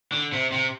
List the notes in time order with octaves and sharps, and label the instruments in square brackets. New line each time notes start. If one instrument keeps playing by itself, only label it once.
[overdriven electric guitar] D3
C3
C3